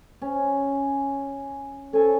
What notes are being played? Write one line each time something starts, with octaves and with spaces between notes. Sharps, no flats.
C#4
C#4 A4 G#5